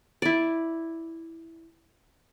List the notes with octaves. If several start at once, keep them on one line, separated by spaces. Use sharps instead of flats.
E4 D5